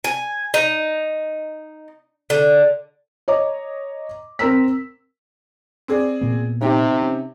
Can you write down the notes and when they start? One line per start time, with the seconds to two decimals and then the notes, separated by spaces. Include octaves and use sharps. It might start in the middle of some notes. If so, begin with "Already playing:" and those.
0.04 G#5
0.54 D#4
2.30 D3
3.28 C#5 D#5 A#5 D6
4.39 C4 A#4 A#5 E6 B6
5.88 C4 G#4 D5
6.21 A#2 B3
6.61 C3 D#4 G4
7.02 C#4